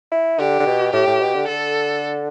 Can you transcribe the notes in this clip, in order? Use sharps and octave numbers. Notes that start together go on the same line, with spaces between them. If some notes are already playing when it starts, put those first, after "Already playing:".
E4
D3 G4
D3
B2
A2 G4
A2
B2
D3
D3 A4